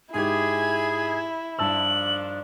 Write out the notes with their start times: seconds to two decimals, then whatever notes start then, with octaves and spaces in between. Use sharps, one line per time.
0.14 G#2 E4 G4 G#4 G#6
1.59 G2 D#3 F3 D4 A5 E6 F#7